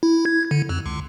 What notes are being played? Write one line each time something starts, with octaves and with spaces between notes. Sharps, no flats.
E4
G#6
D3
F2
C#2